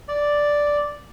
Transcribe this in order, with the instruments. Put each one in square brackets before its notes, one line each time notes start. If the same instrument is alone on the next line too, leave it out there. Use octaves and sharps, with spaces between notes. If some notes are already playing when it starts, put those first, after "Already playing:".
[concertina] D5